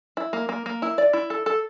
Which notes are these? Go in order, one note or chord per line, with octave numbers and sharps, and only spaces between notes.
E4
A#3
A#3
A#3
E4
D5
E4
A4
A4